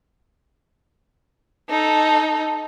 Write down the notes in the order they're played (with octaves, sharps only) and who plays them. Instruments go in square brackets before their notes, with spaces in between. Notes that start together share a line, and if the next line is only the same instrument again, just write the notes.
[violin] D#4 A4